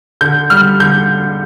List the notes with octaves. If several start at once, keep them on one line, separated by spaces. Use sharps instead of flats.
D3 G6
G3 F6
D3 G6